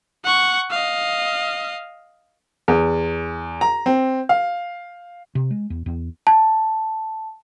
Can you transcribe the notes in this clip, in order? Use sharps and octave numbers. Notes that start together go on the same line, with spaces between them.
F#5 C#6
D#5 F5
E2
A#5
C4
F5
C3
G#3
E2
E2
A5